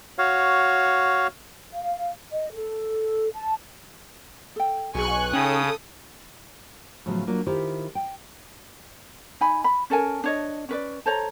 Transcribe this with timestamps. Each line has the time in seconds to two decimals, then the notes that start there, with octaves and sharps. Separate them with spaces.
0.18 F#4 C#5 F5
1.72 F5
2.32 D#5
2.53 A4
3.34 A5
4.56 A4 G5
4.95 B1 F#4 G#4 G#5 C#6 F#6
5.33 C#3 C#4 D#4 A4 G5 D#6
7.06 A2 C#3 F3 F#3 B3
7.27 F#3 A#3 D4 F4
7.46 D#3 E4 F4 G4 C5
7.95 G5
9.41 D#4 G#5 B5
9.64 B5
9.90 C#4 A4 A#4 G#5
10.24 D4 C#5 D#5
10.69 C#4 B4 D5
11.06 A4 C5 C#5 A#5